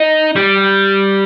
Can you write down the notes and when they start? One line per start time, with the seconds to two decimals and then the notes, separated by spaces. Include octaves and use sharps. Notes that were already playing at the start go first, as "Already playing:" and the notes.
Already playing: D#4
0.36 G3